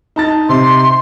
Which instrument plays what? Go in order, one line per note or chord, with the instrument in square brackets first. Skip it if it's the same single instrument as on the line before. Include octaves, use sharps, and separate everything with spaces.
[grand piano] D#4 A5 A6
[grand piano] C3 [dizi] C6